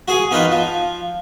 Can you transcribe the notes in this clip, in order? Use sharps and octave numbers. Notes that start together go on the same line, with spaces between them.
F#4 G#4 G#5
B3 D#4 F4 B4
F3